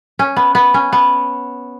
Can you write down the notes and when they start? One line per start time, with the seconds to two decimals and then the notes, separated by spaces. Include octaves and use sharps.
0.19 C#4
0.37 B3
0.55 B3
0.74 C#4
0.93 B3